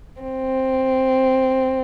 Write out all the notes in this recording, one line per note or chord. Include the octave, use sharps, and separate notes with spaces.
C4